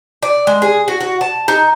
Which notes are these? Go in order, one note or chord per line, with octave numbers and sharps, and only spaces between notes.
D5
G#3
G#4
F#4
F#4
A5
D#4